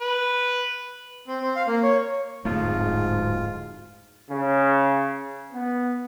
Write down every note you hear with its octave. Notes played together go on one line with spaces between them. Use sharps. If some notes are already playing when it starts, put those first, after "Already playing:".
B4
C4
C4
F5
A#3
C#5
D1 F2 G#2 A3 F4
C#3
B3